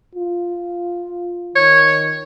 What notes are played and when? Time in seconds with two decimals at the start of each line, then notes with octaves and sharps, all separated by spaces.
0.15 F4
1.56 D#3 C#5